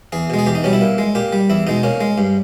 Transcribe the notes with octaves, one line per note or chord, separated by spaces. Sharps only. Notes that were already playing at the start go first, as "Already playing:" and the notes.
E2 G#4
B2 G#3
G#4
E2 G4
D#4
B2 G3 C#4
E4
A#2
G#3
A#2 G4
G3
E2 E4
B2 G#3 D#4
A#2 C#4
G#3
G2